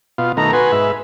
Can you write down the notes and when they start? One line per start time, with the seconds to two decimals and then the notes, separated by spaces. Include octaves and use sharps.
0.18 B2 F4
0.37 B2 D#3 A3 A#5
0.53 F#4 B4 G#5 C6
0.72 G#2 E5